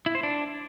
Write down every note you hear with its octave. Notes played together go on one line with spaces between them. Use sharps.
E4
C5
D4